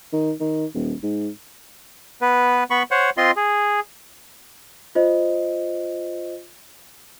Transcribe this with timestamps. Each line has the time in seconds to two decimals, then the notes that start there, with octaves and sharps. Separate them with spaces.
0.13 D#3
0.40 D#3
0.74 D#1
1.03 G#2
2.21 B3 B4
2.70 B3 B5 C#6
2.91 C5 C#5 F#5
3.17 C4 F4 D#5 C6
3.36 G#4
4.95 F4 C5 D#5